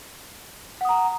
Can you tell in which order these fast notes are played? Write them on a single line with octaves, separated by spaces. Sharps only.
F#5 D#6 A#5